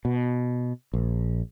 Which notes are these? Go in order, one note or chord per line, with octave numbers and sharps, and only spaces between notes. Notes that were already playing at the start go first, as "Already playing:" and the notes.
B2
A#1